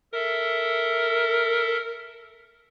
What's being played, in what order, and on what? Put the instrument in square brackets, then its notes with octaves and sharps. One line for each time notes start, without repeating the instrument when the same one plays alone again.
[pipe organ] A4 E5 [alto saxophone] A#4